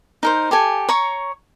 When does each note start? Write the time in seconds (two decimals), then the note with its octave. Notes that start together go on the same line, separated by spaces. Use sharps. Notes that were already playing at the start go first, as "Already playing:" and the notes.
0.23 D#4 A#4 C5
0.51 G4 A4 G#5
0.89 C#5 A#5 C#6